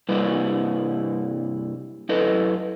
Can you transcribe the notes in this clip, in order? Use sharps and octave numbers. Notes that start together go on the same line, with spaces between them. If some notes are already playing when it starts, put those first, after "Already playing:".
G2 C3 G3 A#3 E4 B4
F#2 E4 A4 B4 D#5